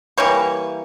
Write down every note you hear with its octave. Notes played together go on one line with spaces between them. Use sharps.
E3 G3 A#3 C#5